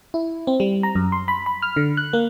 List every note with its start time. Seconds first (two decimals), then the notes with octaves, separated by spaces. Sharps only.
0.14 E4
0.47 C4
0.60 G3
0.83 A#5
0.95 F#2
1.12 C6
1.28 B5
1.46 B5
1.62 F6
1.76 D3
1.97 F#6
2.13 A#3